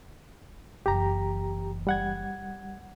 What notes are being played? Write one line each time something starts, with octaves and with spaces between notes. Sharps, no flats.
F#1 E3 G4 A#5
G3 F#5 G#6